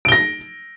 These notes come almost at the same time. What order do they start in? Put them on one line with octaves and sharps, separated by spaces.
D7 G7 A#6